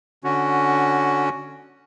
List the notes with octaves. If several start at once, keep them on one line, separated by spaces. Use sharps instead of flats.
D3 C#4 F#4